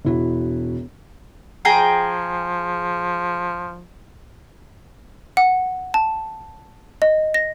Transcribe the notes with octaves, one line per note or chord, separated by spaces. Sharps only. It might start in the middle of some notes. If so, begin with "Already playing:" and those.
E1 E4 F#4
F3 G#4 G5 A#5
F#5
A5
D#5
A#6